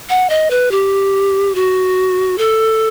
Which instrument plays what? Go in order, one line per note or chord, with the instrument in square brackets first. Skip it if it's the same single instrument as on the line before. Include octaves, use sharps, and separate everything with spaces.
[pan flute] F#5
D#5
B4
G4
F#4
A4